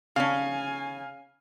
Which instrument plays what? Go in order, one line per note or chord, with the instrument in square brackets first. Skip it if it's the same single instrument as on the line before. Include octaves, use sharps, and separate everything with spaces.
[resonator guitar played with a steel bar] C#3 C#4 [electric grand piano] F5 [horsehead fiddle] G#5